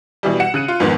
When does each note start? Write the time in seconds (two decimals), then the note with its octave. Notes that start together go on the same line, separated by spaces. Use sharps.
0.23 B2 E3 G3
0.40 F#5 C#7 E7
0.54 C#3 F#6 D#7
0.68 F4
0.80 F2 G#2 D#3 B3